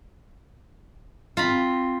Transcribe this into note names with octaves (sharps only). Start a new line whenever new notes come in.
C4 F4 A#5 B5